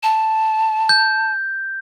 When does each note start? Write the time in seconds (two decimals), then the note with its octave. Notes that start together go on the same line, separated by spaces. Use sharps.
0.03 A5
0.89 G6